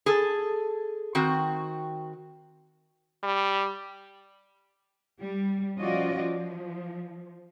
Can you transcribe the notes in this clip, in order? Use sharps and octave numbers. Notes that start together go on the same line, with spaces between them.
G#4 A4
D#3 C4 F#4
G3
G3
F3 C#4 F4 F#4 D5 D#5
F3